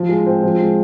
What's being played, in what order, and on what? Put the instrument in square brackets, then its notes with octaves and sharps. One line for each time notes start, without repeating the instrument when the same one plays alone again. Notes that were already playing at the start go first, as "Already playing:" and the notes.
Already playing: [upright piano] F3
G#3
C4
F3
G#3